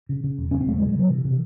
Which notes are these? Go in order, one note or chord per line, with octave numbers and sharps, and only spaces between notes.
C#3
C#3
E1
C#3 C#4
C4
E1 A3
G#3
C#3
G#3
C#3 F#3
C3 E3
C3